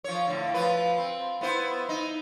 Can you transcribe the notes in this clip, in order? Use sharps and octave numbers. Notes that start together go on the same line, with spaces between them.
F3 C#5
A2 D3
F3 B4
C4
B3 E4 C5
D#4